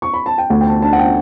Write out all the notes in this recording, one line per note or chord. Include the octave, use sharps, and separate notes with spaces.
C#6
B5
A5
G5
D2 F#5
G5
A5
D4 A5
F#5
G5